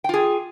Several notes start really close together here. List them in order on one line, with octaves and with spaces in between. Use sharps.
G5 F4 G#4